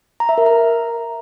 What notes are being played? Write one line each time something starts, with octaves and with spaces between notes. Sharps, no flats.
A#5
E5
A#4
A#5